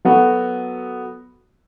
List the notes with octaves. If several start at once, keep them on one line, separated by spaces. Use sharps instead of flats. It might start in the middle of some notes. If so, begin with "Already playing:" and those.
F#3 B3 F#4 A4